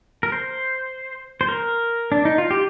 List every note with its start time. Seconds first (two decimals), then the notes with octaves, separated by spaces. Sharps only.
0.23 A#4
0.32 C5
1.41 C5
1.48 A#4
2.12 D4
2.25 D#4
2.38 F4
2.51 G4